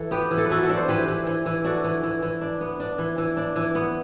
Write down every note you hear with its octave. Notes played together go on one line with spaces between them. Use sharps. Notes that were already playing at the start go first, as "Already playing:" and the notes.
Already playing: E3 A4
B3 G4 B4
E3
A4
B4
E3 F#4 A4
F#4 A4
D4
C5
E3 G4 B4
E3
E3
E3
D4 F#4 A4
E3
E3
E3
D4
B3
D4
E3
E3
D4
E3
B3